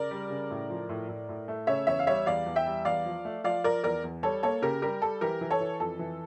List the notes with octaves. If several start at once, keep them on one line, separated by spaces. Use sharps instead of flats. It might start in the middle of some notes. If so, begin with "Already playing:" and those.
Already playing: C#3 A#4 D5
G3
C#3
A2
F3
A2
A2
A2
A3
C#3 C#5 E5
E2 C#5 E5
F5
G3 C#5 E5
E2 D5 F5
E2
E5 G5
G3
E2 D5 F5
F3
A3
F3 D5 F5
F3 A#4 D5
E2 A#4 D5
E2
G3 A4 C#5
A#3 A4 C#5
C#3 G4 A#4
G3 G4 A#4
G3 A4
E3 G4 A#4
E3
A4 C#5
E3
F2 A4
E3